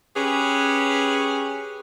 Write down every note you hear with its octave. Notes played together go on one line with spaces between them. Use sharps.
C#4 G4 G#4 B4